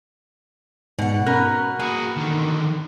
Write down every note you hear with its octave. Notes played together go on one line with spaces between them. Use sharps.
G#2 B2 F#5
C#4 A#4 B5 F#6
A#3 F#4 G#4
D3 D#3